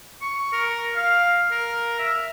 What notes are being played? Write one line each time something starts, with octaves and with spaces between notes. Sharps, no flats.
C#6
A#4
F5
A#4
E5